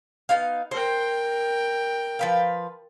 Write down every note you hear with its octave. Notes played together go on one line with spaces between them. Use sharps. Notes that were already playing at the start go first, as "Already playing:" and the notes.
B3 D#4 F5
A#4 C5 G5
F3 B4 F5